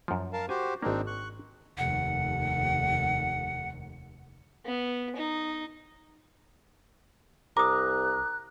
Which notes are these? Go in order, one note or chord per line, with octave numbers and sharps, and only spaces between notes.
F#2 F3
A#4 F5 A5
F#4 G4 C5 G#5
G#1 A#3 C4 D4 D#4
C#6 F#6
F1 D#2 F#5
B3
D#4
C2 A#5 D6 D#6 F#6